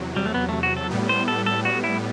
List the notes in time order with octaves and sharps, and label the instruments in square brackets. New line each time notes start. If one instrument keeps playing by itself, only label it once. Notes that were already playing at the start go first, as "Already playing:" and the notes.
Already playing: [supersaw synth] E2 C3 F#3
[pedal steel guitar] G3
A3
B3
A3
F#4
A4
[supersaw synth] A2 G3 B3
[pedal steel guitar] C5
A4
A4
F#4
E4